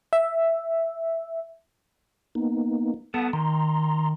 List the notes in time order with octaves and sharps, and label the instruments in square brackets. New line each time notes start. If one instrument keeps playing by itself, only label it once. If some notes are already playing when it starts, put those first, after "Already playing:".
[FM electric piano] E5
[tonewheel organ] A#3 B3 D#4
[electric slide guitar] B3 A4 [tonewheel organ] F#5 A5 D#6
[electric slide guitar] D#3 [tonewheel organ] A#5 C6